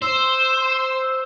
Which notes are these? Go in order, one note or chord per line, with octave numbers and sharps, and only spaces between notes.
C5 E6